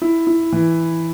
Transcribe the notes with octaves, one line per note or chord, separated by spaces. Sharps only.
E4
E4
E3